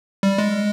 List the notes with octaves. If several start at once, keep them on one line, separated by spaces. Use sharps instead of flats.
G3
G#3